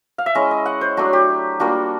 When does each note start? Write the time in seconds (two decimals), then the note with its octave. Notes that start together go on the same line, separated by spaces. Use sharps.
0.18 F5
0.26 E5
0.35 G#3 C#4 E4 D#5
0.51 D#5
0.66 F#5
0.81 C5
0.97 F#3 A3 D4 F#4
1.13 G4
1.60 G3 A#3 D4 F4 F#4